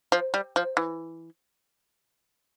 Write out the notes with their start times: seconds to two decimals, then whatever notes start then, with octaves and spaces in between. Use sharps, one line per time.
0.12 F3
0.34 G3
0.56 F3
0.77 E3